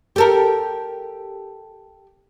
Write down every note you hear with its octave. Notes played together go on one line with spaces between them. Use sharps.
G4 A4 A#4